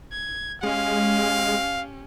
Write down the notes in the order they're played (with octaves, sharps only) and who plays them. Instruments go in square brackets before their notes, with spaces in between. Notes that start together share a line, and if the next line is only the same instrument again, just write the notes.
[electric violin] G#6
[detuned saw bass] G#3 [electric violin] C#4 G4 [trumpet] F5